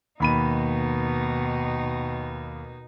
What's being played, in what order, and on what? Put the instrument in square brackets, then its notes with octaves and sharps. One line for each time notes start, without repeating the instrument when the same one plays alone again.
[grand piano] D#2 B5 D#7 [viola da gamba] B2 D#4